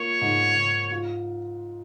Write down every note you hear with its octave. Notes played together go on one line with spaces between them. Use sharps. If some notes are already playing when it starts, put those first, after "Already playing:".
Already playing: A#3 F4 C#5
G#2
G#2
F4